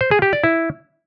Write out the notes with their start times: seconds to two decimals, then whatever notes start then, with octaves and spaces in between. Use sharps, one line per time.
0.01 C5
0.11 G#4
0.22 G4
0.33 D5
0.44 E4